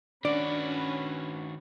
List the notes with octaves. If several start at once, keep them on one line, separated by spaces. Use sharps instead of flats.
D#3 C#4 D4 F#4 B4 D5